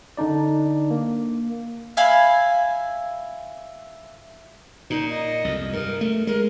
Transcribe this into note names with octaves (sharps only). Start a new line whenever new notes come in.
D3 D4 D#4 D5
A#3
E5 F5 G#5 B5
A#2 D#4
D#5
C2 F2
G2 A#4
A3
G#3 A#4